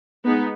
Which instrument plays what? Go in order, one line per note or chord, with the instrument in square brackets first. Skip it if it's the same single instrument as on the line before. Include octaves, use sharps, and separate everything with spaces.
[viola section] G#3 B3 D#4